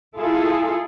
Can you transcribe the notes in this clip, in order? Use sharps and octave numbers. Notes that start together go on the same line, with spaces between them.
E4 F4 G#4 A4